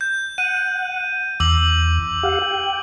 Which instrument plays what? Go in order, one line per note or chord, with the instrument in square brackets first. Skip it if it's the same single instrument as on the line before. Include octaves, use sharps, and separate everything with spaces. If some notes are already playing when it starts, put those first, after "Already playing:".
[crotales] G6
[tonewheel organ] F#5 [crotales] D#7
[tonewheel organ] E2 [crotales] D6 E6 F#7
[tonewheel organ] G4 F5 F#5
G5